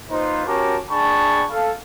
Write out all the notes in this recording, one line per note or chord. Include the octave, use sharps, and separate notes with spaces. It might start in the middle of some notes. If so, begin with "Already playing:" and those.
A#3 D#4 F4 B4 C5
C#4 F#4 G4 A#4 A5 D6
D4 G#4 G5 A5 B5 C#6
A4 F5